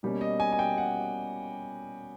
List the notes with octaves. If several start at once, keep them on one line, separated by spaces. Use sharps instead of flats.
B2 G3 A#3 C#4
D#5
G#5
G#5
G5
F#5